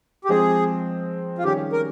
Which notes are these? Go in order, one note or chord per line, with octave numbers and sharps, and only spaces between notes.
G4
F3 G#3 C4 G#4
F4
D#3 G3 C#4 G4 G#4 C#5
A#4